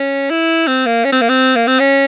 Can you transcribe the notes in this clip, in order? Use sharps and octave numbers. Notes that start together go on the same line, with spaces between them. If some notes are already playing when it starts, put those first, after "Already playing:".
Already playing: C#4
E4
C4
A#3
C#4
C4
A#3
C4
A#3
C4
C#4